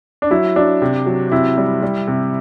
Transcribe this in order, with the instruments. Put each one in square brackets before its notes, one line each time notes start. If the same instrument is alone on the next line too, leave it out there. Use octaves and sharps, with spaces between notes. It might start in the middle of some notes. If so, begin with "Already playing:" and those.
[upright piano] D4
F#3 E4
F#3 D4
C3
F#3
C3 E4
G3
G3
C3